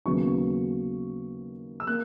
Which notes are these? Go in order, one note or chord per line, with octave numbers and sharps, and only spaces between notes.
D#2 C#3 F#3 B3 C#6
E6
A#3 F#6